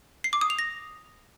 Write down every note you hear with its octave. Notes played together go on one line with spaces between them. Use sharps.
C7
D6
D#6
F7
A#6